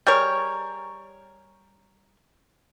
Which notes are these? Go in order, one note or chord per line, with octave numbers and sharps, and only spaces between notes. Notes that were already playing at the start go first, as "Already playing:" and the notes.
G3 G#4 A#4 C#5